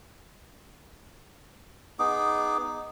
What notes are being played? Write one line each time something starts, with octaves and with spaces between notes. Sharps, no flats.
B3 D#4 G#4 D6